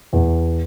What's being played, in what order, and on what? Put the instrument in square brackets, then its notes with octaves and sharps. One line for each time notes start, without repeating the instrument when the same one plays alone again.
[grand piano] E2